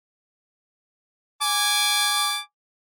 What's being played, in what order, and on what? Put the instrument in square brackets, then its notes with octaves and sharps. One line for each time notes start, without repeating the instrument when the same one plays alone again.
[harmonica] G#5 D6